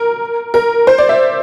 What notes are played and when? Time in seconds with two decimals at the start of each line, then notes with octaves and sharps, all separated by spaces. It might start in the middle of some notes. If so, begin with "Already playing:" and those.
Already playing: A#4
0.54 A#4
0.87 C5
0.98 D5
1.09 E5